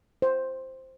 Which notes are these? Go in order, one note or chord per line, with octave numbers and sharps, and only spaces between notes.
C5